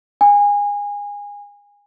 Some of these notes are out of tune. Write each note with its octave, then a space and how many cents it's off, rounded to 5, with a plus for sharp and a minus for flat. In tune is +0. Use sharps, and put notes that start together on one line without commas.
G#5 -25